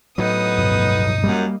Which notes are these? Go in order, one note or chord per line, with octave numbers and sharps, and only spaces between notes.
A2 F#3 B3 D#4 D#6
G2 B2 F3
F#2 G3 A3 A#3